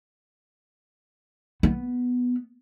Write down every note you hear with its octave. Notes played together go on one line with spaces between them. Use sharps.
B3